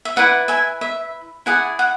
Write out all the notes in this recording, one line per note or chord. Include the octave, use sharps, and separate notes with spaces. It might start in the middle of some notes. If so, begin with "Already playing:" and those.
E5
E4 B4 D5 F#5
E5 G#5
E5
E4 G#4 D5 F#5
F#5